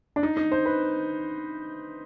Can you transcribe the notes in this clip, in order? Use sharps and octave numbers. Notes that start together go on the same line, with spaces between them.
D4
D#4
D#4
C5
B4